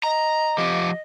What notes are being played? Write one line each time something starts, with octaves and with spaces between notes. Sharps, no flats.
D#5 A#5
F3 G4